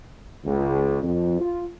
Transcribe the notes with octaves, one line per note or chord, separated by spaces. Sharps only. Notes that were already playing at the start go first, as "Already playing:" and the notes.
C#2
F2
F4